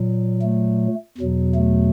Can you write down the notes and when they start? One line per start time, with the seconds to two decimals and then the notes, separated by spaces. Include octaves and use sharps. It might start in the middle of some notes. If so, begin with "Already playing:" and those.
Already playing: A#2 F#3
0.42 A3
1.18 E2 B2 F#3
1.55 A3